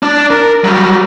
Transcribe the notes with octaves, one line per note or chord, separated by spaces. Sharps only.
D4 D5
A#4
F#3 G3